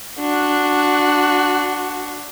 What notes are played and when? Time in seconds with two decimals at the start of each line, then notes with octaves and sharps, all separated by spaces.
0.19 D4 F#4